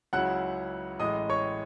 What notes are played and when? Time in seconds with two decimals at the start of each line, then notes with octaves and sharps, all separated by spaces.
0.13 C#2 C#3 F#3 C#4 E4 F#5 F#6
1.00 A1 A2 G#3 D#5 D#6
1.30 C#5 C#6